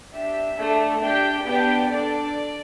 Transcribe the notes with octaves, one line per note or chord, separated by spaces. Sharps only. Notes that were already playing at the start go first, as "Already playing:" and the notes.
D4 G4 E5
A3 D4 A4
D4 G4 G5
B3 D4 G4 G5
D4 A4 D5